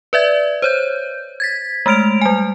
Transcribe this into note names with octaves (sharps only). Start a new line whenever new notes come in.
B4 D5 E5 G#6
C5 C#5 G6
G#6 A6 B6
G#3 A3 F6 D7 F7
G3 G#5